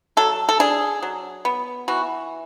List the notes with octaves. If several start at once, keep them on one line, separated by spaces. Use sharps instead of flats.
F#3 A4
A4
D4 G#4
F#3
B3
E3 F#4